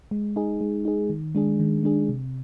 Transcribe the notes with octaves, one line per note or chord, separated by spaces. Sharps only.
G#3
D#4 G#4
G#3
D#4 G#4
D#3
G#3 D4 G#4
D#3
G#3 D4 G#4
C3